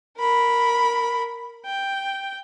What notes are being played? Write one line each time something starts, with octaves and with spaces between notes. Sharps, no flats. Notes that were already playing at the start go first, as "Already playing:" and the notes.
A#4 B5
G5